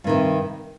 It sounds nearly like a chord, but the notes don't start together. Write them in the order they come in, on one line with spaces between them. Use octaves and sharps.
G2 D#3 C3